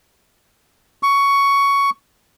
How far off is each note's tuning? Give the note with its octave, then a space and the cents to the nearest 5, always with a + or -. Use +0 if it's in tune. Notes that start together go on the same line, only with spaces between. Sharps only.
C#6 +10